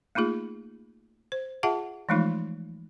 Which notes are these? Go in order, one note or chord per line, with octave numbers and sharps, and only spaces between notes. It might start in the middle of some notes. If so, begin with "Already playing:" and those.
A3 A#3 D#4 F4 G#4
C5
F4 G#4 E5 F#5 A5
E3 F3 G#3 A3 D#4 F4